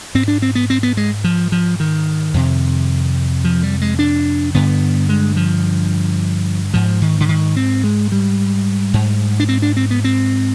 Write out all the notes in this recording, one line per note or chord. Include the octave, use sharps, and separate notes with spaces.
G#2 C4
D4
C4
B3
C4
B3
G#3
F3
F3
D#3
F2 C3
F3
G3
G#3
D4
G2 D3 B3
G#3
F3
G#2 F3
D#3
D3
D#3
C4
G#3
G3
G#2
D4
C4
D4
C4
B3
C4